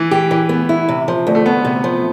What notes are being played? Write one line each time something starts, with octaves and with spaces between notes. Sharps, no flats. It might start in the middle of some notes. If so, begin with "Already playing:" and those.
Already playing: E3
G4
E3
B3
E4
C3
F3
D2
A3
D2 B3
C3
F3